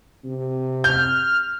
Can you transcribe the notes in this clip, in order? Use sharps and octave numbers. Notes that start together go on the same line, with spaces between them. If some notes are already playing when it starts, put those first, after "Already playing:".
C3
F6 G6